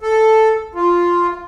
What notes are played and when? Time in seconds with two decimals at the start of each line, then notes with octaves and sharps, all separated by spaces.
0.01 A4
0.75 F4